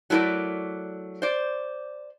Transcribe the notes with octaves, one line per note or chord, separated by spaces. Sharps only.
F#3 A3 E4 A#4 D5
C5 D5